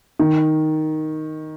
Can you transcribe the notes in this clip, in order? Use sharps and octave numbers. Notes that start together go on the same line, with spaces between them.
D#3